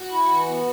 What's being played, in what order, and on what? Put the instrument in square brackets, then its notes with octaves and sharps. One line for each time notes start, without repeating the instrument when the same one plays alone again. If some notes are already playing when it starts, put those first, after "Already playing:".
Already playing: [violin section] F#4
[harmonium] E4
E3
B3